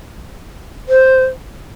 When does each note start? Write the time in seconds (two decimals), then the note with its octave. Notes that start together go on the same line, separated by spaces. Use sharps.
0.89 C5